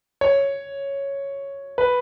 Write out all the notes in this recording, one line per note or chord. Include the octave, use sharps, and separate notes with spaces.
C#5
B4